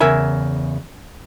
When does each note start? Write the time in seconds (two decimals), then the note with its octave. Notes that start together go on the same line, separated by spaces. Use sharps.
0.01 E2 C#3 A#4 E5 G#5